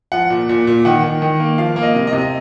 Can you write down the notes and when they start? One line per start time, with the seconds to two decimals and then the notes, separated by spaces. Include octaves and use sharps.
0.12 F3 F#5
0.30 A#2
0.49 A#2
0.67 A#2
0.85 D#3 F#5
1.04 D#3
1.22 D#3
1.40 A#3
1.58 F3 F5
1.76 A#3
1.83 D#5
1.94 C3
2.07 D#5
2.13 C3